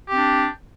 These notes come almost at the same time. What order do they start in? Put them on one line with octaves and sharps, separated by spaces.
G4 C4 D4